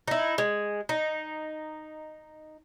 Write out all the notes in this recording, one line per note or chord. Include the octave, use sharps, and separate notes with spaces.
D#4 E4
G#3
D#4